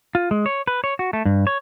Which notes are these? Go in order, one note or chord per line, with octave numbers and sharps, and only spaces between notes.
F4
G#3
C#5
B4
C#5
F#4
A3
G2
C#5